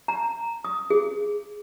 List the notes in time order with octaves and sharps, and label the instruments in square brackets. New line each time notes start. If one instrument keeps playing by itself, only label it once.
[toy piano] A#5
D#6
G#4